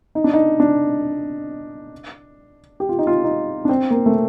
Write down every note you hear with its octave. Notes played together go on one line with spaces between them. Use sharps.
D#4
D4
D#4
D4
G4
F4
D#4
F4
D#4
D4
C4
A#3
A3